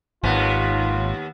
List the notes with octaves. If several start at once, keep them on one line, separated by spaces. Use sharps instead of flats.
G#1 D#2 B3 F4